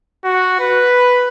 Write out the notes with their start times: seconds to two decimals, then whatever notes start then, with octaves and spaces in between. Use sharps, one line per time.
0.25 F#4
0.61 B4